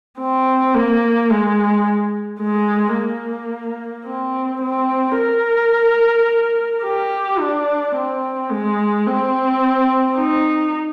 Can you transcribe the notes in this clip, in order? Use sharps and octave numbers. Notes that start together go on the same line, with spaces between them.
C4
A#3
G#3
G#3
A#3
C4
C4
A#4
G4
D4
C4
G#3
C4
D#4